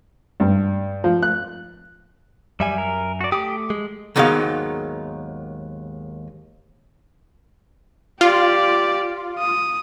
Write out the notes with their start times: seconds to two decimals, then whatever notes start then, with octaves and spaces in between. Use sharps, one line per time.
0.40 G2
1.04 F3
1.23 F#6
2.60 F#2 G3 E5 G#5
2.78 A#4
3.21 F#4 D5
3.32 A3 G4 D6 D#6
3.70 G#3
4.16 D#2 G#2 D#3 F#3 B3 F5
8.21 F4 G4 D5
9.39 D#6